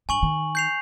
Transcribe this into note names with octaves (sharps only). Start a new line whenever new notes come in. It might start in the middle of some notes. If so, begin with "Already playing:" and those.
G2 G#5 C#6 F#7
D#3
G6 C7 F7